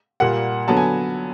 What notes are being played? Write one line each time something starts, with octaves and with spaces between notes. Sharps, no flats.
A#2 G3 A#3 F#5
D3 F#3 B3 A5
G#5